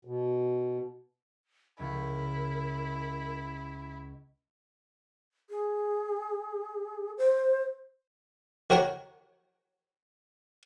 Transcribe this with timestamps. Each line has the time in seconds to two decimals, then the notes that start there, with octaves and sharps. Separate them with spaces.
0.05 B2
1.79 C#2 C#4 E4 A#4
5.50 G#4
7.18 C5
8.70 D#3 F#4 A#4 C#5 F#5 A#5